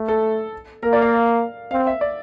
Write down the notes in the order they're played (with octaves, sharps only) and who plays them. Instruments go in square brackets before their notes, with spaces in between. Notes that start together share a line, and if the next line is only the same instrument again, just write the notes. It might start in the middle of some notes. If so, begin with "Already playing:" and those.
Already playing: [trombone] A3
[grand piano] A4
[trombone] A#3 [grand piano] A#4
[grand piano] D5
F5
[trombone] C4 [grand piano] F5
[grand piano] E5
D5